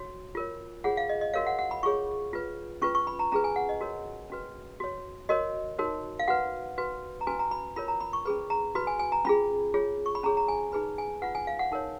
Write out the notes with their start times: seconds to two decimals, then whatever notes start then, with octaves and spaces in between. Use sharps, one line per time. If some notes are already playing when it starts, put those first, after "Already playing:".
Already playing: F#4 C#5
0.35 F4 A#4 C#5
0.84 F4 G#4 C#5 F#5
0.97 F5
1.09 D#5
1.21 D#5
1.33 F#4 A#4 C#5 F5
1.47 F#5
1.59 F#5
1.71 B5
1.83 F4 G#4 C#5 C#6
2.33 F4 B4
2.82 C#4 F4 B4 C#6
2.95 C#6
3.07 B5
3.19 A#5
3.32 C#4 F4 G#4 B4 A#5
3.44 G#5
3.56 F#5
3.69 D#5
3.81 F#4 A#4 C#5
4.30 C#4 F#4 B4
4.80 F#4 C#5
5.29 F#4 A#4 C#5 D#5
5.79 D#4 F#4 A#4 C#5
6.19 F5
6.28 F#4 B4 F#5
6.78 F#4 B4
7.21 A#5
7.27 C#4 F#4 B4 G#5
7.39 A#5
7.51 B5
7.76 F4 A#4 C#5 B5
7.88 A#5
8.00 B5
8.13 C#6
8.25 C#4 G#4 B4 B5
8.50 A#5
8.75 F#4 B4 B5
8.87 G#5
8.99 G#5
9.12 A#5
9.25 C#4 F4 G#4 B5
9.74 F4 G#4 C#5
10.06 C#6
10.15 B5
10.23 C#4 G#4 C#5 A#5
10.37 A#5
10.48 G#5
10.72 D#4 G#4 B4 B5
10.98 G#5
11.22 F4 B4 F#5
11.35 G#5
11.47 F5
11.59 F#5
11.72 D#4 A#4 C#5